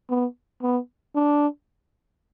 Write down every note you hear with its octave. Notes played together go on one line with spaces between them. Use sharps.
B3
B3
D4